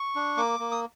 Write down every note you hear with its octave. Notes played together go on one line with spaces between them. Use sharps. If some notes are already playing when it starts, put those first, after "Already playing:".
Already playing: C#6
D4
A#3 D6
A#3
D#6